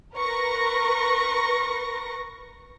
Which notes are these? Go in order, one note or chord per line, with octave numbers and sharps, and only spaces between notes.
A#4 B4 C#6 A#6